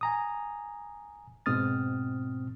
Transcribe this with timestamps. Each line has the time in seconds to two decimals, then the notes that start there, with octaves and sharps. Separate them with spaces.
0.01 G#5 A#5 D#6
1.46 G#2 B2 C4 D#6 F6 A6